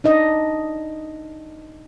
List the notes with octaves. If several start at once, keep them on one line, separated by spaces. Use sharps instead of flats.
D4 D#4 D#5